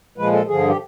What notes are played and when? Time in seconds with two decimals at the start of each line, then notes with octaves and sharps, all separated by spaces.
0.18 A#2 F3 G#3 B4
0.33 A4
0.48 G2 D3 F3 G#4
0.68 G4